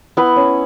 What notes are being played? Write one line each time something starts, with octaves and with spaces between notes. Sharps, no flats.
B3 E4 B4
C#4